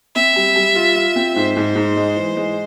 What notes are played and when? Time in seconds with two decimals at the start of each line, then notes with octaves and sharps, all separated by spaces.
0.16 C4 E5
0.36 G3
0.56 G3
0.75 F4
0.96 F4
1.16 C4
1.36 G#2 C5
1.56 G#2
1.75 G#2
1.96 G#3
2.17 E3
2.36 G#3